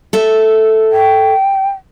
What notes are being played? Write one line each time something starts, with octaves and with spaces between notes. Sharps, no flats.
A4 E5
G5